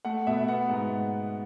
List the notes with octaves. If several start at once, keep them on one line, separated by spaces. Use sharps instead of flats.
A3 F#5
B2 E5
B3 F#5
G#2